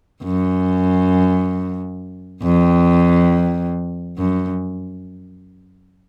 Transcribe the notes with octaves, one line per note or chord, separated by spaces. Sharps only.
F#2
F2
F#2